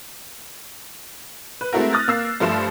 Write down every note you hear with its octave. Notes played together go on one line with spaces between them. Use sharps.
B4
G#3 A3 C4 E4 F#4 A#4
D#6 F6 F#6 A6 A#6
A#3 E6 C7
G2 F3 A3 C6 E7